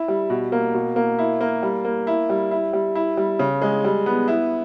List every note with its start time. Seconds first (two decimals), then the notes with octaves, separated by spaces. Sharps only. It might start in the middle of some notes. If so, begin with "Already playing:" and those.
Already playing: E4
0.08 G3
0.30 B2
0.52 A#3
0.74 B2
0.96 A#3
1.19 E4
1.41 A#3
1.63 G3
1.85 A#3
2.07 E4
2.30 G3
2.51 E4
2.73 G3
2.95 E4
3.17 G3
3.39 C#3
3.62 G#3
3.84 G3
4.06 B3
4.28 E4